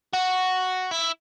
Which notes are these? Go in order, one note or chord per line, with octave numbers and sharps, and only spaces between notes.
F#4
E4